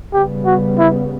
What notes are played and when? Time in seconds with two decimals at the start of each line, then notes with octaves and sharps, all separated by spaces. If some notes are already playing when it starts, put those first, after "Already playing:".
0.13 C#3 G3 B3 G4
0.45 F#4
0.78 E4